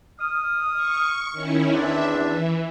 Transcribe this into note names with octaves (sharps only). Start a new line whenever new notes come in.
D#6 F6
C#6
D#3 C#4 E4
E2 C4 D4 E5
E3